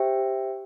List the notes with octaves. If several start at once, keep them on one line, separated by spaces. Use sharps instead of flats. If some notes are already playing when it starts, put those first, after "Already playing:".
Already playing: G4 C5 E5 G5